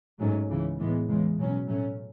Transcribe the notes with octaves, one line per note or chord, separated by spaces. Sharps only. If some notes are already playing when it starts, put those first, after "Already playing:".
G#2 F#3 A3 C#4
C#2 C#3 E3
A2 E3 G#3 B3
E2 C#3 G#3
B2 F#3 C#4
A2 F#3 A3 C#4